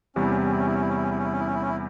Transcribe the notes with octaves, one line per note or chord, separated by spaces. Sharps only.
E2 C3 G3 C#4
E4
C#4
E4
C#4
E4
C#4
E4
C#4
E4
C#4
E4
C#4
E4
C#4
E4
C#4
E4
C#4
E4
C#4
E4